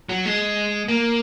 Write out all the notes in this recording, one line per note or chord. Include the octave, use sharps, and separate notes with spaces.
F#3
G#3
A#3